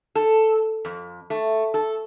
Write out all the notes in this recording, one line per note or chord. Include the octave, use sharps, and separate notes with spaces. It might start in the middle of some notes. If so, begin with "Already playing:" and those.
A4
F2
A3
A4